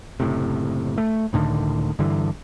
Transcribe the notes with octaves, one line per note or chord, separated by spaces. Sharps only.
F#1 A2 C3
A3
C#2 A2 D3 D#3
G2 D3 E3